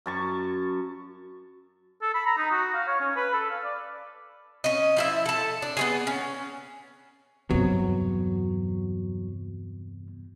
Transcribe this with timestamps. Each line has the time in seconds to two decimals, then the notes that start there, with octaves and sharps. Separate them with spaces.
0.06 F#2 A5 C#6
2.02 A4
2.14 B5
2.26 A#5
2.38 D#4
2.51 F#4
2.74 F5
2.87 C#5
3.00 C#4
3.16 B4
3.33 A4
3.50 F5
3.64 D5
4.64 C#4 D#5
4.97 F3 E4 E5
5.26 A4 A5
5.62 D4
5.77 B3 C#4 G#4
6.07 C#4
7.50 E2 G2 C3 F#3 B3